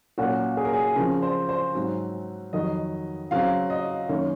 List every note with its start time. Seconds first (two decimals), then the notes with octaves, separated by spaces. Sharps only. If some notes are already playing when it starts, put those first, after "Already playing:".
0.18 A#2 F#3 A#3 C#4 F#4
0.57 G#4
0.65 A#4
0.73 G#4
0.96 C#3 F3 C4 A#4
1.22 C5
1.49 C5
1.75 G#2 F#3 C4
2.53 F2 D#3 F#3 D#5
3.31 C#3 F#3 C4 F5
3.70 D#5
4.09 F#2 D#3 A#3 C#5